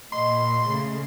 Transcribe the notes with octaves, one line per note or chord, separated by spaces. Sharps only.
A#2 D#5 C6
C#3 A3